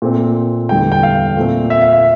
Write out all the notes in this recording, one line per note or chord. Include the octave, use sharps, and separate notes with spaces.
A#2 A3 C4
E2 D3 G3 G5
G5
F5
A#2 A3 C4
E5
F5
E5